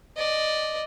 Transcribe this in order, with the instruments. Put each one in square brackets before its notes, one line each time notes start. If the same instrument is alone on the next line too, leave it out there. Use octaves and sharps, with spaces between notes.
[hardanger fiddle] D5 D#5